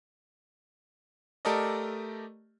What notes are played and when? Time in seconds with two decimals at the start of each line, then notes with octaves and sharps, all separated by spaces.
1.45 A3 G4 A4 A#4 D5 D#5